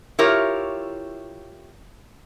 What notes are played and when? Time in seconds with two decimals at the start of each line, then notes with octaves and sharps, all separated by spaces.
0.19 E4 F4 G4 A#4 C#5